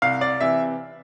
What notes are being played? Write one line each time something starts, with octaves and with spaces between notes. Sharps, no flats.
C2 F5
D5
C3 E3 E5